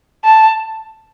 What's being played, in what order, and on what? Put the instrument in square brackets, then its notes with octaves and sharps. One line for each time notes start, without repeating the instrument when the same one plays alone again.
[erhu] A5